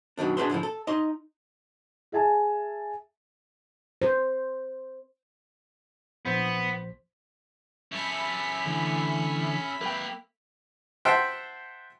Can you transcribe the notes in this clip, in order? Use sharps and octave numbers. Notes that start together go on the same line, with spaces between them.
F#2 B2 D#3 D4
B2 D4 G#4 B4 E5 C6
G#2 D3 F3 E4
A4
D#4 D#5 C6
G#4 E5 G#5 A5
C5
A#1 B3 C5 B6
C#4 A4 E5 B5 B6
D3 E3 A3
A#3 A#4 B4 G5
C5 E5 F#5 G5 A5 C6